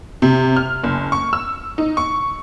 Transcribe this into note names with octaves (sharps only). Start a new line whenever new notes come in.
C3
F6
F#1
C#6
E6
D#4
C#6